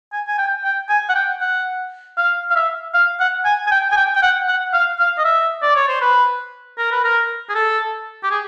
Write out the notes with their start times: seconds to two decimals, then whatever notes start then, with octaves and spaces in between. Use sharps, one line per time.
0.12 G#5
0.27 G#5
0.38 G5
0.64 G5
0.89 G#5
1.09 F#5
1.15 G5
1.41 F#5
2.17 F5
2.51 F5
2.56 E5
2.94 F5
3.20 F#5
3.45 G#5
3.67 G#5
3.71 G5
3.92 G#5
3.96 G5
4.15 G5
4.22 F#5
4.48 F#5
4.73 F5
4.99 F5
5.18 D#5
5.25 E5
5.62 D5
5.76 C#5
5.88 C5
6.01 B4
6.78 A#4
6.92 B4
7.04 A#4
7.49 G#4
7.55 A4
8.23 G4
8.31 G#4